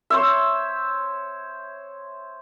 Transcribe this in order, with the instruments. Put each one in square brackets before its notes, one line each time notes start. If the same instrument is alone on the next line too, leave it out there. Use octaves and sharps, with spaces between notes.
[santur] C5 C#5 E5